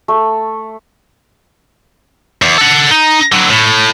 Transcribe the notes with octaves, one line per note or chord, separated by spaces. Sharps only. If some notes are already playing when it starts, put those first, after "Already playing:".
A3
E2
A4 F#5
D#4
D3 F#3
A2